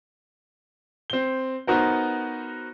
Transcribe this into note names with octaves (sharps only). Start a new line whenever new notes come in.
C4 G7
B3 D#4 F#4 A#4 C5